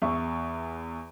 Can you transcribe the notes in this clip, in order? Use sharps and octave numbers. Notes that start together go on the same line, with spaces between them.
E2 E5 C#6